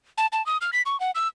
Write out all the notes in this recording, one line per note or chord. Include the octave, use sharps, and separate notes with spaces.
A5
A5
D#6
F6
B6
C#6
F#5
E6